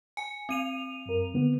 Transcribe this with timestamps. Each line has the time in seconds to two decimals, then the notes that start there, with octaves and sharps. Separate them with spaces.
0.17 G#5 C#7
0.49 C4 D#7 F7
1.06 F#2 A#4
1.34 D3 B3